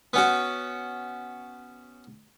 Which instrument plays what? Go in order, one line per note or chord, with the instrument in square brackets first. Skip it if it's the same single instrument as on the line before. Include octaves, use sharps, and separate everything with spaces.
[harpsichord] B3 C#4 F#4